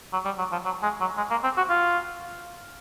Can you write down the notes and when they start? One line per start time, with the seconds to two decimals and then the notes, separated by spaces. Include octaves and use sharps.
0.13 F#3
0.25 G3
0.38 F#3
0.52 F3
0.65 F#3
0.83 G#3
1.01 F#3
1.17 G#3
1.31 A#3
1.44 C4
1.57 F#4
1.69 F4